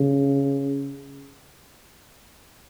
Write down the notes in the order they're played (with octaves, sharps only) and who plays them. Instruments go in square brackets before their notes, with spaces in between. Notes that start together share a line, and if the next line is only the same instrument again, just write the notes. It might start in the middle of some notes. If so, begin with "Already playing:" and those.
Already playing: [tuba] C#3